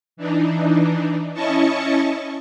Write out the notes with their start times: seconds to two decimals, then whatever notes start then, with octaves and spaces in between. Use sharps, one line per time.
0.17 E3 D4 D#4
1.34 C#4 E4 D#5 A5 C#6